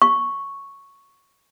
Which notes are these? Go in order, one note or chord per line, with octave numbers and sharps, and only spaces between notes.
C#6